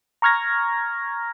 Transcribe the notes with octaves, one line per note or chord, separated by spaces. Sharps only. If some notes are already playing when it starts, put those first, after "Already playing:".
A#5 C#6 F6 G#6 A#6